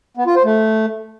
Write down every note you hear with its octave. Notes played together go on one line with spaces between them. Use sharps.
B3
F4
C5
A3